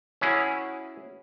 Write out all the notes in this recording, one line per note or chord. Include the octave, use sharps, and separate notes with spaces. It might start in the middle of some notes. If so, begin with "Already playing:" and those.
C#4 E4 F#4 G#4 C#5